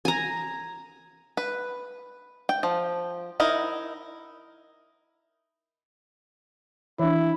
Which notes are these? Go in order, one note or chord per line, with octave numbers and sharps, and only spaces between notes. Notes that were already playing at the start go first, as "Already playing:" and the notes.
G#5 A#5
B4
G5
F3
D#4 E4 A#4
E3 D4 E4